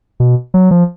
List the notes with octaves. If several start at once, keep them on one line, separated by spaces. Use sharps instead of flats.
B2
F#3
F3